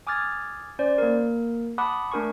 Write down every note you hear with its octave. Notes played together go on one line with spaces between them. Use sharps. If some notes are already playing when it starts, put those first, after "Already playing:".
G#5 D6 D#6 F6 G#6 A6
C#4 C5 D5 G6
A#3 A#4
F#5 A5 B5 D6 D#6 F#6
A3 D4 A#4 G#5 C#6